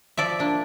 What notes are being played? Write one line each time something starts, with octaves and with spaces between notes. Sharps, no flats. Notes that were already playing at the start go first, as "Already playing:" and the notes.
F3 D5 E5
A#3 D4